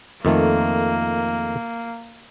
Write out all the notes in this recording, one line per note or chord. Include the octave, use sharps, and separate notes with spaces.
F2 D#3 A3 A#3